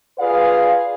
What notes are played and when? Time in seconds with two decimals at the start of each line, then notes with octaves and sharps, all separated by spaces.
0.19 F4 G#4 B4 D5 F5